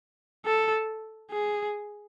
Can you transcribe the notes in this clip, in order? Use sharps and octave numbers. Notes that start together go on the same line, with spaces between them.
A4
G#4